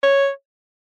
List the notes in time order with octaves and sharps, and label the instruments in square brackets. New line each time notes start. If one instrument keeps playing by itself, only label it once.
[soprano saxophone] C#5